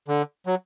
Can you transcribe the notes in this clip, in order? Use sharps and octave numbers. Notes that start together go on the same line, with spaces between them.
D3
F#3